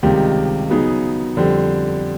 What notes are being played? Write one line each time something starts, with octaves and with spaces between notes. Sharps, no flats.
C#2 C3 D#3 G3
C#3 F#3 B3 D#4 G#4
F2 D3 G3 C4